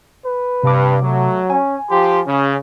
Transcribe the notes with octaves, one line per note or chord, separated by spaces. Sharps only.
B4
G2 C3 D6
F#3 A3
C#4 G#5
F3 G4 C6
C#3 C#4